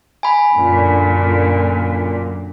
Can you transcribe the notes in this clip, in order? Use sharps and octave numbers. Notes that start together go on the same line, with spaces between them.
G#5 B5
F#2 A#2 D3